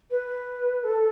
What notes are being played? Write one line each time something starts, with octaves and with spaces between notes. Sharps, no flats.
B4
A4